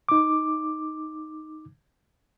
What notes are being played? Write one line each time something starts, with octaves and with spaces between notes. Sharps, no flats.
D#4 D6